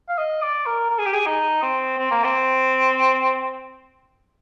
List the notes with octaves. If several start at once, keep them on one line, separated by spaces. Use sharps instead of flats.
F5
D#5
D5
A#4
A#4
G#4
G4
G#4
D#4
C4
C4
A#3
C4